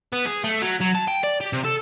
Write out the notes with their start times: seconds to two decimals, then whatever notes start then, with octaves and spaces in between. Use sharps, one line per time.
0.13 B3
0.26 G#4
0.44 A3
0.62 F#3
0.81 F#3
0.95 A5
1.08 G5
1.24 D5
1.41 G4
1.53 C3
1.64 A4